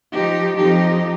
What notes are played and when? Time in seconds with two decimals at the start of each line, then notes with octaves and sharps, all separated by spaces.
0.13 F3 D#4 G4
0.58 F2 F3 D#4 G4